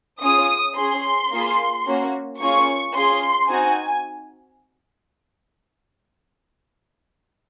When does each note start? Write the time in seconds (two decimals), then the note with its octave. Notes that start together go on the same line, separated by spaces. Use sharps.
0.22 C#4 F4 G#4 D#6
0.78 C#4 G#4 C6
1.32 A#3 F4 G#4
1.87 A#3 C#4 F#4
2.40 A#3 C#4 F4 G#4 C#6
2.95 C#4 F4 G#4 C6
3.50 C4 D#4 F#4 G#5